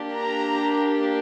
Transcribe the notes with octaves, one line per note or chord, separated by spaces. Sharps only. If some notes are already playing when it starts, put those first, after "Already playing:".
Already playing: A#3 D4 G4
A#5